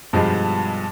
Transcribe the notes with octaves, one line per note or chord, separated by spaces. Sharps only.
G2 B2 F3 G3 G#3